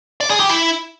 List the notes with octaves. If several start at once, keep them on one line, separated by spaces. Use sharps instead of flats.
D5
G#4
G4
E4